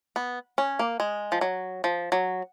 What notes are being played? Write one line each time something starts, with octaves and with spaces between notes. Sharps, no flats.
B3
C#4
A#3
G#3
F3
F#3
F3
F#3